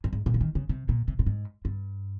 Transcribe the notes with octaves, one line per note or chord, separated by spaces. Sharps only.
G2
G#2
A#2
F3
D#3
C#3
C3
A#2
C3
A#2
G#2
G2